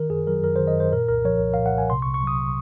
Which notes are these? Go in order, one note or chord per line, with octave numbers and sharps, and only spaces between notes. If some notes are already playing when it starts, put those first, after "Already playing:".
Already playing: D#3 A#4
F#2 G#4
F#3 A#4
F#2 A#4
C5
D#3
D#5
F#2 C5
A#2 A#4
C2 A#4
F3 C#5
C2
F5
A#2
F#5
C2 G#5
C3 C6
C#6
C2
C#6
F#3 D#6